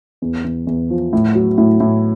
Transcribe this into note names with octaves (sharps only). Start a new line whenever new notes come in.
E2
E2
E2
F3
A2
F#3
A2
A2